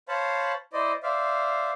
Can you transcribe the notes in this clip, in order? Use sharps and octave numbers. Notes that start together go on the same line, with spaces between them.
C5 C#5 F5 A5 B5
E4 C5 D5 D#5
C5 D5 E5 F5